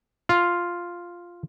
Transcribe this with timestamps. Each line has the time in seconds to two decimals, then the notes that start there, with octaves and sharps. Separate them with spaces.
0.29 F4